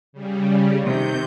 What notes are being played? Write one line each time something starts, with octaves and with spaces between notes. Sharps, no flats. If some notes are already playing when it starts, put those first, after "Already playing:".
C#3 G3
C3 D#3 G6